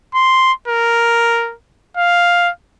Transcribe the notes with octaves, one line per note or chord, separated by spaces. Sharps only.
C6
A#4
F5